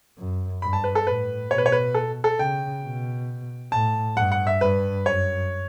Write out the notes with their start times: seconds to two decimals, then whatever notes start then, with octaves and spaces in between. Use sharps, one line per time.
0.18 F#2
0.62 G2 B5
0.73 A5
0.84 B4
0.95 A4
1.06 A2 B4
1.50 B2 C#5
1.58 B4
1.66 C#5
1.72 B4
1.94 A4
2.24 A4
2.39 C#3 G5
2.83 B2
3.72 A2 A5
4.17 G2 F#5
4.32 F#5
4.47 E5
4.61 G2 B4
5.05 F#2 C#5